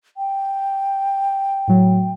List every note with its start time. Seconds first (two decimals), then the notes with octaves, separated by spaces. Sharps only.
0.17 G5
1.68 A2 F#3